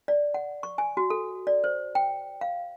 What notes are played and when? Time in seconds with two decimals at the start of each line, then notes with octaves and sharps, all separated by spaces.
0.08 D5
0.34 F#5
0.63 C#6
0.78 G#5
0.97 F#4
1.10 A4
1.47 D5
1.64 C5
1.95 G5
2.41 F5